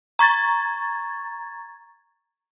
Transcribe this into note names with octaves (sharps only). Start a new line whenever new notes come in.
A#5 C#6 G#6 A6